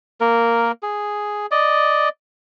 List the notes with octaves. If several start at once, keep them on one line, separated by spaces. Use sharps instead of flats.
A#3 A#4
G#4
D5 D#5